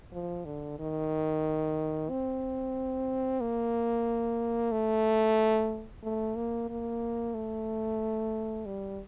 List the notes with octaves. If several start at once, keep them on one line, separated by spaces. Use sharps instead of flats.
F3
D3
D#3
C4
A#3
A3
A3
A#3
A#3
A3
G3